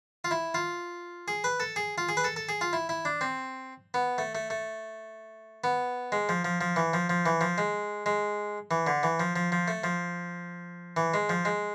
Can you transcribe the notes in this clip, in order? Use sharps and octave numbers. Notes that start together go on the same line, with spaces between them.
F4
E4
F4
G#4
B4
A4
G#4
F4
G#4
B4
A4
A4
G#4
F4
E4
E4
D4
C4
B3
A3
A3
A3
B3
G#3
F3
F3
F3
E3
F3
F3
E3
F3
G#3
G#3
E3
D3
E3
F3
F3
F3
A3
F3
E3
G#3
F3
G#3